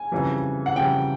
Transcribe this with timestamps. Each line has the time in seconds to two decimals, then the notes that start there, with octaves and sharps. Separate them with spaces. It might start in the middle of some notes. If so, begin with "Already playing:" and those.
Already playing: G#5
0.12 F2 C#3 E3 G3
0.66 F#5
0.76 F2 C#3 E3 G3 G5